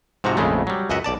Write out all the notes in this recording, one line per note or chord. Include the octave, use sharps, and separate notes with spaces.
G#2 C3 F3 F#4 A#5
A#1 F2 C#3 G#3 A3
F#3 G3
C#2 F#2 D#5 E5 F#5
B1 D5 A5